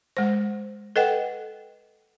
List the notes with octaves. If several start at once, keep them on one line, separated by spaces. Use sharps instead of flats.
G#3 C5
A4 B4 D#5 F#5 G5